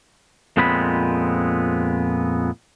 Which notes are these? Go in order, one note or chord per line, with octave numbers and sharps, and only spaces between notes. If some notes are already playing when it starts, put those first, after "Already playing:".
F2 A#2 G#3 B3 C4 B5